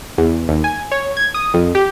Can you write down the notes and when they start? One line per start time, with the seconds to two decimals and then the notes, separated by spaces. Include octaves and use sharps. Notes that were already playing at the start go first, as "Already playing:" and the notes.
0.18 E2
0.49 D#2
0.64 G#5
0.92 C#5
1.17 G#6
1.34 D#6
1.54 F2
1.75 G4